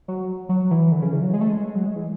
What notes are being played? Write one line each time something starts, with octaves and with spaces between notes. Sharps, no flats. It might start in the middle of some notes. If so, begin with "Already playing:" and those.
F#3
F#3
E3
D3
C#3
E3
F#3
G#3
A3
G#3
F#3
G#3
E3